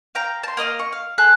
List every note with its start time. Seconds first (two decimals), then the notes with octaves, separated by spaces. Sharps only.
0.15 F5 G5 A#5
0.43 A5 C6
0.57 A#3 D#5 D#6 F6
0.79 C#6
0.92 F5
1.18 G#4 A4 F#6